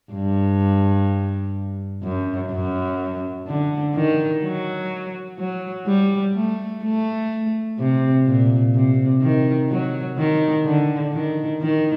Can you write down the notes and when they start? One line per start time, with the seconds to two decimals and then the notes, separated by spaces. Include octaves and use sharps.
0.13 G2
2.03 F#2
2.51 F#2
3.48 D3
3.94 D#3
4.43 F#3
5.39 F#3
5.86 G3
6.34 A3
6.83 A3
7.79 C3
8.26 A#2
8.74 C3
9.21 D#3
9.70 F#3
10.18 D#3
10.66 D3
11.13 D#3
11.62 D#3